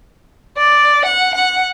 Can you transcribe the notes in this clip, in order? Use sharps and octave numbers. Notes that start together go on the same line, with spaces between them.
D5
F#5
F#5